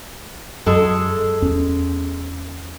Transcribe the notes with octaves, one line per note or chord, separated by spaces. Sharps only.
F#2 G#3 A4
E2 C#4